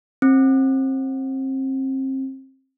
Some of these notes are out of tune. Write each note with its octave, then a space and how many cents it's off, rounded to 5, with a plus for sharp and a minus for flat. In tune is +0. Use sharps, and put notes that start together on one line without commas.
C4 +30